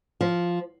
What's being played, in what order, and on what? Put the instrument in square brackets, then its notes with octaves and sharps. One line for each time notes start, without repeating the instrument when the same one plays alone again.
[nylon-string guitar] F3